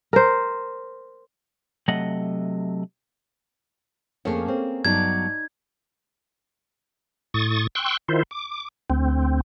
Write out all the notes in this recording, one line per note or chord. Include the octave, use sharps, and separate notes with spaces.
A#4 C5
C3 F#3 A3 D#5 F#5
F2 A3 A#3 C#4 G#4 C#5
C4
G2 F#3 B3 D#4 D5 A5 G#6
A2 C#6 D#6 A6
G5 C6 C#6 E6 F#6
D#3 E4 F4 C5
D6
D2 C4